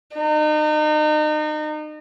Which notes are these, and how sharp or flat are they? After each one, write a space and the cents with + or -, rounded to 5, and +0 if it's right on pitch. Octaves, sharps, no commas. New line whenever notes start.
D#4 -35